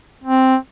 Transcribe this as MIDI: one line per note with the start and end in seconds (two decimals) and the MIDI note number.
0.24 0.56 60